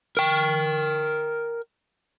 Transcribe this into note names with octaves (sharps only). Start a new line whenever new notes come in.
A#4 G5